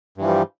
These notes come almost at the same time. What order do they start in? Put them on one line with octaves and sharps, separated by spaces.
G2 E3 F3 G3